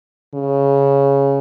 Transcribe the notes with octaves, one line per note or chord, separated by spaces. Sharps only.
C#3